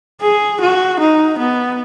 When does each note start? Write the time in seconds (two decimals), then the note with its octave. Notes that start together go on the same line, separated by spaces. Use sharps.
0.22 G#4
0.61 F#4
1.00 D#4
1.38 B3